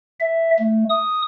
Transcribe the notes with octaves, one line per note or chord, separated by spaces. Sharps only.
E5
A3
D#6